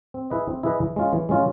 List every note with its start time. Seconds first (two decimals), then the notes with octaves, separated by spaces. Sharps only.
0.14 C4
0.30 E4 G#4 B4 D#5
0.48 C4
0.63 E4 G#4 B4 D#5
0.80 E3
0.96 G#3 C#4 F4
1.13 E3
1.29 G#3 C#4 F4